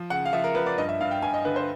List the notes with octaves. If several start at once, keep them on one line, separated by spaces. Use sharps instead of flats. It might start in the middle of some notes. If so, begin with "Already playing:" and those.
Already playing: F3
C#3 F#5
F5
F3 E5
A#4
F3 B4
D5
G2 D#5
E5
G2 F5
G5
G2 G#5
D#5
D3 B4
C5